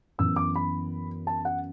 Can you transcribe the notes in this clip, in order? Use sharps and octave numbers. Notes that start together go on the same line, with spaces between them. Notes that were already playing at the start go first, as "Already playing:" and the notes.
F#2 E3 B3 E6
D6
B5
A5
F#5